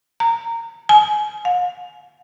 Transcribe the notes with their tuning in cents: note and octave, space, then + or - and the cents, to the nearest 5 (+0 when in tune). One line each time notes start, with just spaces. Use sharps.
A#5 -20
G#5 +25
F5 +45